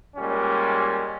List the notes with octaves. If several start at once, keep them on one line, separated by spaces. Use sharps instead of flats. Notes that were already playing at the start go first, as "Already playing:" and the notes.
A#2 G3 G#3 C#4